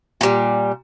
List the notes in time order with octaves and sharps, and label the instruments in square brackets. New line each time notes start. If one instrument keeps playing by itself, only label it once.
[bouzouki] A#2 G3